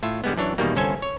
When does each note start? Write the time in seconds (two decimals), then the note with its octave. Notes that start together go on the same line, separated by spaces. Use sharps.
0.03 A2 F4 E5
0.24 D3 G3 G#3 B3
0.37 F#2 E3 D4 C#5
0.58 E2 B2 D#3 G3 A#3
0.75 G1 C2 C#4 A4 C5 G#5
1.02 C#5